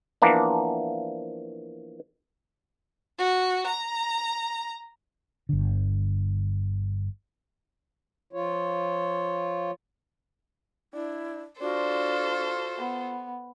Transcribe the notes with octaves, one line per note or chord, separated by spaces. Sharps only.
E3 F3 A#3 B3 D4
F#4
A#5
G1 D3
F3 F4 C#5
D4 E4
D4 F4 F#4 A4 C5
B3